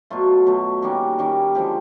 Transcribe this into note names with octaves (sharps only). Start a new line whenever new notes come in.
B2 F#3 A3 F4
B2 F#3 A3
D#3 G3 A#3 C#4 F#4
D#3 G3 A#3 C#4
D3 F3 G#3 G4